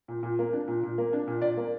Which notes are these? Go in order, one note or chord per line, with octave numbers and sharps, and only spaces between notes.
A#2
A#2
A#3
D4
A#2
A#2
A#3
D4
A#2
A#2 D5
A#3